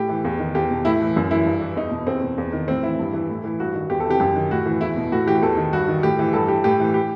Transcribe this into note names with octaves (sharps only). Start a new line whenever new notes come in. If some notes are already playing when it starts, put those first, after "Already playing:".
Already playing: A2 G4
E3
E2
D#3
E2 G4
B2
A2 E4
E3
F#2
E3 E4
G2
E3
E2 D#4
B2
E2 C4
B2
E2
D#3
A2 C4
E3 E4
G2
E3
A2
E3
G2 F#4
D#3
E2 G4
A4
C3 E3 G4
F#2 G4
D#3
A2 F#4
E3
E2 E4
B2
A2 F#4
E3 G4
E2 A4
D#3
G2 F#4
D#3
A2 G4
E3
G2 A4
E3 G4
A2 G4
E3
G4